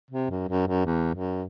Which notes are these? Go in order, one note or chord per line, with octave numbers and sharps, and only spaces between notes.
C3
F#2
F#2
F#2
E2
F#2